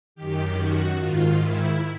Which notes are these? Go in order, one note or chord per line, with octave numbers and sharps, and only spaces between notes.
F#2 D#3 G4
F#4
G#2 D#3 F4
E4